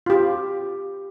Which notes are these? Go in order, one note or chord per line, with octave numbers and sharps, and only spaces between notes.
F4 G4